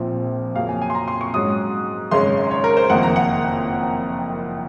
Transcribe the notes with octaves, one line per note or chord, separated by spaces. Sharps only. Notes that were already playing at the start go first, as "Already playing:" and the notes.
Already playing: A#1 A#2 F3 C4
F2 C#3 F#3 A#3 C#4 F5
G#5
G#5
C6
A#5
C6
C#6
G#2 F#3 C#4 D#6
G#1 F#2 C#3 G#3 C#4 C6
C#5
A#4
C5
F#1 F2 D#3 A#3 F#5
A#5
F#5